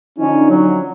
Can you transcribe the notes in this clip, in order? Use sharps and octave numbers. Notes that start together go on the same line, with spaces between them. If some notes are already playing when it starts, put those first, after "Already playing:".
D3 F3 C#4 D#4
F#3